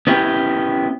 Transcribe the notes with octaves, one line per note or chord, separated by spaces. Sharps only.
B3 C#4 E4 G4